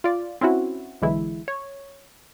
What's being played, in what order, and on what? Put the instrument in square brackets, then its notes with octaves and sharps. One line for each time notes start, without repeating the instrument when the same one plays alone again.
[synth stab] F4 D5
C4 C#4 E4 F#4
B1 D3 E3 G#3 E4
C#5